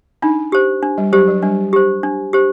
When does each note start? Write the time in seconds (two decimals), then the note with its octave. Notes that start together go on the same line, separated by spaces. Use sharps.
0.22 D4 D#4
0.52 G4 C5
0.83 D4
0.98 G3
1.13 F#3 G4 C5
1.28 F#3
1.42 G3 D4
1.73 G4 C5
2.03 D4
2.33 G4 C5